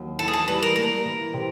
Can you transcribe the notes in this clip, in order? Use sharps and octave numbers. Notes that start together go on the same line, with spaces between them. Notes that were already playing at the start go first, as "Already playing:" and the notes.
Already playing: D#2 F#3
E3 A4
G#4
A4
G3 B4
A#4
A#3 A#4
E3
C3